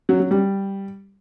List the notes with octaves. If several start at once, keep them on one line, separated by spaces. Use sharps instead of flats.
F#3
F#3
G3